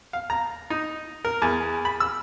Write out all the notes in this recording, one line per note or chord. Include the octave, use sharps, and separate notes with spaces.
F5
A#5
D#4
A#4
E2
B5
E6